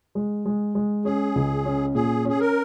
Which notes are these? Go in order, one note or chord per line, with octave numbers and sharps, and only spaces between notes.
G#3
G#3
G#3
C#4 G#4
C#2
C#4
A#2 G#4
C#4 G#4
A#4